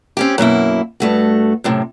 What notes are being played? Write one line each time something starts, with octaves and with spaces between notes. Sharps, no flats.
C4 C#4 G4
F#2 B2 A#3 E4
G2 A3 F#4
F#2 A2 C3